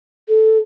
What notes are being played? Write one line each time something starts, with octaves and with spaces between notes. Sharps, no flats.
A4